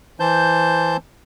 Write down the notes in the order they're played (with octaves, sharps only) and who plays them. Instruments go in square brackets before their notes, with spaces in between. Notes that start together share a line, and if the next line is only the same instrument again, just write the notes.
[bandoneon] E3 C5 A5 G6